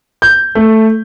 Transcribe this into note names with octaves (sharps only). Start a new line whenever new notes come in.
G6
A3